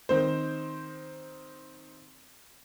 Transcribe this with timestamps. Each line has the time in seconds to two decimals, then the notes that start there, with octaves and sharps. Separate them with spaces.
0.09 D#3 C4 C5